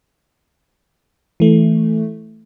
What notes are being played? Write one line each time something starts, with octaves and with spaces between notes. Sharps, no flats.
E3 A3